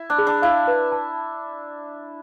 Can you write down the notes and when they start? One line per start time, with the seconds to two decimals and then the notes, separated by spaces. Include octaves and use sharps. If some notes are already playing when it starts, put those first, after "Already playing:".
Already playing: E4
0.10 D4
0.18 G#4
0.27 D4
0.42 E4 F5
0.67 B4
0.92 A5